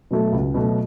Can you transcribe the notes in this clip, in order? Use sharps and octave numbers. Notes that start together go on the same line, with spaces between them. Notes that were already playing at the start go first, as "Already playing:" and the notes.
B2 F#3 A3
C#2
B2 F#3 A3